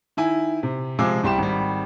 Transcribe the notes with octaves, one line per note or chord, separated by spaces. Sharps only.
D#3 E4 G#5
C3
C3 F3 G#3 G#5 D6 E6
C2 G3 G4 C6 E7
G#1 G3